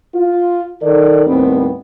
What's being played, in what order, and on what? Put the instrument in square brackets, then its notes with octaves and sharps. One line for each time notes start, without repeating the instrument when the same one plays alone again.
[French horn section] F4
D#3 A4 D5
D#2 A2 G3 B3 C4